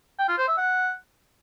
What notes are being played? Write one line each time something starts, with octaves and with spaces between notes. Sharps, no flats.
G5
F4
C5
E5
F#5